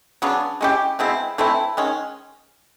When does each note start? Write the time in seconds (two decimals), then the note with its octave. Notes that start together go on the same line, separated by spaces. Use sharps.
0.22 C#3 F#3 B3 D4
0.61 G#3 C#4 E4 G4
0.99 B2 G#3 C4 E4
1.38 E3 A3 C4 E4
1.77 D#3 G#3 C#4